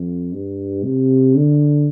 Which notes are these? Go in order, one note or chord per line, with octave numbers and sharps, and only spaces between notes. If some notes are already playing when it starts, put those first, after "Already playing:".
Already playing: F2
G2
C3
D3